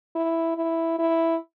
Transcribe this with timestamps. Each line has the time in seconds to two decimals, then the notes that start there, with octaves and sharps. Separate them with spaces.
0.15 E4
0.56 E4
0.99 E4